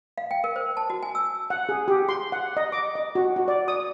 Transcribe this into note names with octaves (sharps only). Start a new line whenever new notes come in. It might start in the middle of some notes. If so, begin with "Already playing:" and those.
F5
G5
A#4
C5
A5
F#4
G#5
E6
F#5
G#4
G4
C6
F#5
D#5
D6
D#5
F#4
F#4
D5
D#6